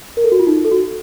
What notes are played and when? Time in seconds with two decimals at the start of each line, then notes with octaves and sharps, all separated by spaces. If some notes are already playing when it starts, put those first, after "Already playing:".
0.17 A#4
0.24 A4
0.32 F#4
0.40 F4
0.47 D#4
0.65 A4
0.71 F#4